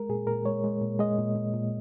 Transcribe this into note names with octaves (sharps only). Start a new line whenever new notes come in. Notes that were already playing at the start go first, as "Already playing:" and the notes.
Already playing: G#3 A#4
A#2 G#4
A#2 A#4
G#3 C#5
G#3
A#2
G#3 D#5
A#2
A#2
A#2